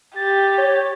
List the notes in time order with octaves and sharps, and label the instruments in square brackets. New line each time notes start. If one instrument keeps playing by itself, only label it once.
[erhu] G4 [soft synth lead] A6
[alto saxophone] C#5